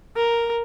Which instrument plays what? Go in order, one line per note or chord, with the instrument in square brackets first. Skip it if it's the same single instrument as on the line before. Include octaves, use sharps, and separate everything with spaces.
[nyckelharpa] A#4